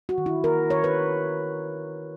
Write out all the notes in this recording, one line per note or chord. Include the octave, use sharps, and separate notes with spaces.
F#4
D#3
E4
D#3 A#4
D#3 C#5
B4